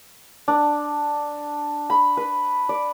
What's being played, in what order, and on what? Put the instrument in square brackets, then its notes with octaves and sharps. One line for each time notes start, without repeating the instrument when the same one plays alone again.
[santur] D4
B5
B4
D5